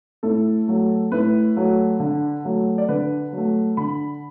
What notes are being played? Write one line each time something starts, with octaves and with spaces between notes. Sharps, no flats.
A2 A4
F#3 A3
A2 B4
F#3 A3
D3
F#3 A3
D5
D3 B4
F#3 A3
D3 B5